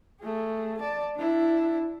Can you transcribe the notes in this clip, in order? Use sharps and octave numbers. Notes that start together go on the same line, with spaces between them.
A3 G#4
D5 A5
D4 E4